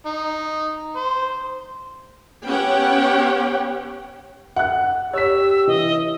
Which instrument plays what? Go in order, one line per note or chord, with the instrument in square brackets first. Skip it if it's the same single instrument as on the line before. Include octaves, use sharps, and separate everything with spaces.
[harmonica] D#4
C5
[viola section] B3 C#4 G4 C#5 F#5 G5
[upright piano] F#5 F#6
[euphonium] G4 [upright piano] C#5 B6 [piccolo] E6
[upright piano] E3 [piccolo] D#5